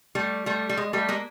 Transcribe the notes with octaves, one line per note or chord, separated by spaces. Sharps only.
G3 A3
G3 A3
G3
G#3
G3 A3
G#3 A#3